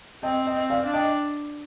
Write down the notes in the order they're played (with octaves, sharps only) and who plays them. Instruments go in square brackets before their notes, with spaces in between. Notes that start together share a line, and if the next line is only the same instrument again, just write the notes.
[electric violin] C4 [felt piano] D#5 G5
[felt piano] D#5 G5
[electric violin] C4
[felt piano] D5 F5
[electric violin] D4
[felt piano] D#5 G5